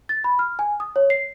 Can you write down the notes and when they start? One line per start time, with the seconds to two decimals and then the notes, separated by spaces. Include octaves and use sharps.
0.09 A6
0.24 B5
0.39 F6
0.59 G#5
0.80 D#6
0.96 C#5
1.10 C7